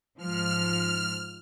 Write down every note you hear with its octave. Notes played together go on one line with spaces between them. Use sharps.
G#2 F3 F6